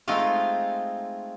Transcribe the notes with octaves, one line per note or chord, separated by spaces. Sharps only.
G#3 A3 C4 D#4 F4 F5